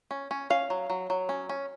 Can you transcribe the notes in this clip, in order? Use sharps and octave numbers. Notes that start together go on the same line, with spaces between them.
C#4
C#4
C#4 F5
F#3
F#3
F#3
C#4
C#4